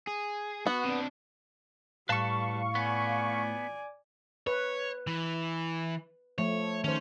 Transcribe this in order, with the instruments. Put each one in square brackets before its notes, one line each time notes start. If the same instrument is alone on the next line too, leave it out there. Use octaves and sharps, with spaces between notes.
[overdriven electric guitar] G#4
[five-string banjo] B3 [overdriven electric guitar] F#4
[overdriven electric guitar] C3 D4
[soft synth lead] A2 [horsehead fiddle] G3 [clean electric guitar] B4 A5 [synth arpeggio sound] F5 C#6
[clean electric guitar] B3 [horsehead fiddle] D5 G#5
[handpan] B4 [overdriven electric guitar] C#5
[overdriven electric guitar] E3
[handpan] F3 A3 [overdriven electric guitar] C#5
[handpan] D#3 C5 [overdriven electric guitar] C#4